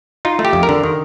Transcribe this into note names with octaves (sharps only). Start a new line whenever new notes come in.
D#4 F4
A3
G4
F2
A#4
D3
D#3